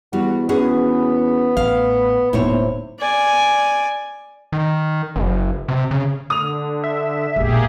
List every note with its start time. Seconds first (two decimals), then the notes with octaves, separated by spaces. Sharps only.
0.13 E2 G3 F#4
0.49 B3 C#4 F#4 G#4
1.57 A1 F5
2.33 D1 B1 A2 C3 A#3 E4 C5 C#5
2.99 D5 G#5
4.52 D#3
5.16 F#1
5.68 C3
5.91 C#3
6.30 D3 D#6 F7
6.84 E5
7.36 E1 A#1 A#3 G4 G#4